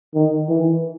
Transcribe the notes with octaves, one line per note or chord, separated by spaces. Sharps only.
D#3
E3